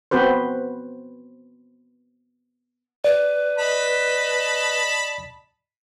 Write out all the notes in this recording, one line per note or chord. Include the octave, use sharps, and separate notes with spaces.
B3 C4 F#4 B4 C5
B4 D5
D#5 A5 B5